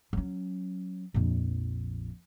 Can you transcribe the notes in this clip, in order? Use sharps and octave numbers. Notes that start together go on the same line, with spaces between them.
F#3 C#4
A#1 F2